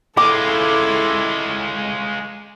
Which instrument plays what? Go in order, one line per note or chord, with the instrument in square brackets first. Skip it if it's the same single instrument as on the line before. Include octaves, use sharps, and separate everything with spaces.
[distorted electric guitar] G#3 F4 [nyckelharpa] E4 A4 [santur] D6